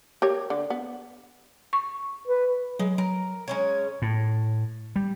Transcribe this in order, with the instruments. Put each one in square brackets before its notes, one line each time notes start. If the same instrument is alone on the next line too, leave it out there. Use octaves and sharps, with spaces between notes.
[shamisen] G4 A#4 C#5
D3
B3
[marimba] C#6
[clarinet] B4
[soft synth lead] F#3 [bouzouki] G#3
[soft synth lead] F#3 [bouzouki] A#4
[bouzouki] G#3 C#4 C#5 [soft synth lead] G#6
[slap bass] A2
G3